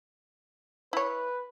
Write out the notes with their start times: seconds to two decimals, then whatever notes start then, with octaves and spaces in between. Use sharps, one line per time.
0.93 E4 B4 C#5